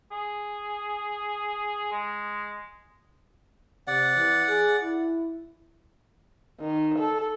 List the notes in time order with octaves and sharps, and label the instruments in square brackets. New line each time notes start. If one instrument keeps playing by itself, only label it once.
[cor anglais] G#4
G#3
[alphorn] C3 [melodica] D5 F#5
[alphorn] E3
G#4
E4
[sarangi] D#3
A4